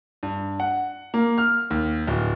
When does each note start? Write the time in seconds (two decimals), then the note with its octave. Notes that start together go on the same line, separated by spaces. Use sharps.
0.23 G2
0.60 F#5
1.14 A#3
1.38 F6
1.70 D#2
2.07 D1